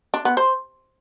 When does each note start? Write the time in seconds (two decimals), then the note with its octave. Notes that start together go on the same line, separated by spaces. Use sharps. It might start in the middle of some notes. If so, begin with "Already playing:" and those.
0.14 D4
0.25 B3
0.37 C5